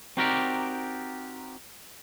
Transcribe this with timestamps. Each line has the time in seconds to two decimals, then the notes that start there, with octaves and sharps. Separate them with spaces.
0.17 C4 D#4 F#4 G4 A#4 D5